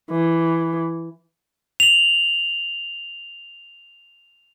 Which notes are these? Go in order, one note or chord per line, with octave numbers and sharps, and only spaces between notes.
E3
F7 F#7